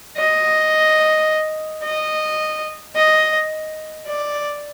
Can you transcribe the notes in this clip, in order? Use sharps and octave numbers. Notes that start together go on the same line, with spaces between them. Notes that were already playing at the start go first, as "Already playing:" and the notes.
D#5
D#5
D#5
D5